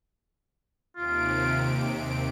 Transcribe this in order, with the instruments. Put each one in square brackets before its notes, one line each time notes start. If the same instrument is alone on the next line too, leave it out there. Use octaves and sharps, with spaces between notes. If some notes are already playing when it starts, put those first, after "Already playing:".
[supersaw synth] D#2 C3 D7 [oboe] F4